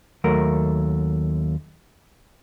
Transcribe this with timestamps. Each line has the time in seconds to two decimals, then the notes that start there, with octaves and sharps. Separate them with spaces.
0.24 D#2 F#3 A3 A#4